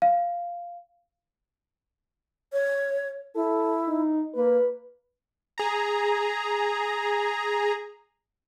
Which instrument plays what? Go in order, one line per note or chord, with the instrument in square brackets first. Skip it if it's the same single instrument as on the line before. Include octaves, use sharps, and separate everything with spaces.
[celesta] F5
[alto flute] C#5
[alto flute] E4 [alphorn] A4
[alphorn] D#4
[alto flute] A#3 [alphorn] B4
[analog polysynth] G#4 A#5